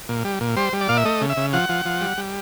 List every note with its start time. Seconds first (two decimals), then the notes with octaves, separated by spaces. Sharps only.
0.09 A#2
0.24 G3
0.41 A#2
0.57 G3 C5
0.73 G3
0.81 D5
0.89 A#2 F5
0.97 E5
1.05 A3 D#5
1.21 C#3
1.29 E5
1.37 C#3
1.53 F3 F#5
1.69 F3
1.85 F3
2.01 G3
2.18 G3